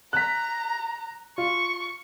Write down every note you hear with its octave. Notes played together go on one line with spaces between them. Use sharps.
A#5 F#6 B6
F4 C#6